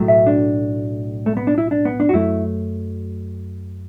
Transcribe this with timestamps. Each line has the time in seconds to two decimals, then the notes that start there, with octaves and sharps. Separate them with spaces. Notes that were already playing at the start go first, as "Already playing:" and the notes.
Already playing: B1 A2 F#3 A3
0.08 E5
0.27 D4
1.26 A3
1.37 B3
1.47 D4
1.58 E4
1.71 D4
1.85 B3
2.00 D4
2.09 F#4
2.13 F#2 F#3 A3 E4